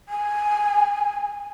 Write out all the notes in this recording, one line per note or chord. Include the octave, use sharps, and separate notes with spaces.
G#5